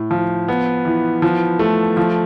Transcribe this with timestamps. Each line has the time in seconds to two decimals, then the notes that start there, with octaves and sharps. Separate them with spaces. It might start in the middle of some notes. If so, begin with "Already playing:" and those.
Already playing: A2
0.11 F3
0.48 B3
0.85 E3
1.22 F3
1.59 A3
1.97 F3